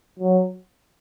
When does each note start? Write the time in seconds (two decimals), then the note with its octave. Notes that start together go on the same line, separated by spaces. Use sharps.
0.19 F#3